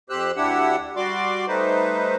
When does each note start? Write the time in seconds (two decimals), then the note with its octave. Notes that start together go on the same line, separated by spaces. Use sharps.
0.10 F2 G4 C5 E6 F#6
0.37 D2 D4 E4 G4 F#5 E6
0.96 G3 F#4 D5 C6 D6
1.47 G3 A3 D#4 B4 C5